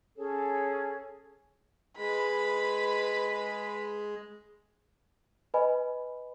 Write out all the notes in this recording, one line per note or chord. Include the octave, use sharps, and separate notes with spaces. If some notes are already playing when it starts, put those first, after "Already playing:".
C#4 G#4 A4 C#5
G#3 B4 B5
B4 D#5 G#5 B5